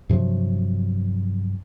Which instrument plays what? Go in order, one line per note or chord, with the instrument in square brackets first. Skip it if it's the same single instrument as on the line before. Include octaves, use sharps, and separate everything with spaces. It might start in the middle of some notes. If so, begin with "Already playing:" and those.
[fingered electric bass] G2 C3 F3 F#3